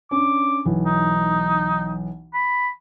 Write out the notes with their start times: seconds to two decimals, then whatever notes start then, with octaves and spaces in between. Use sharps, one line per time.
0.11 C#4 D4 D6
0.65 B1 E3
0.86 D#4
2.34 B5